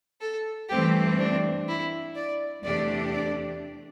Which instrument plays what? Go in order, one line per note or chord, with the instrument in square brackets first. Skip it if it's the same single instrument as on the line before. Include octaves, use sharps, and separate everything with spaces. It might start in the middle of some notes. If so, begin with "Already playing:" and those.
[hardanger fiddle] A4
[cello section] G2 E3 A3 C4 [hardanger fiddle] G4
[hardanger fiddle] D4
E4
D5
[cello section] E2 C3 A3 D4 G4 [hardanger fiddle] D5
[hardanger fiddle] D5